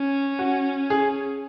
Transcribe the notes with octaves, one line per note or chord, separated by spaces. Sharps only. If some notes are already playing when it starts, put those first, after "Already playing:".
Already playing: C#4
F#4
G#4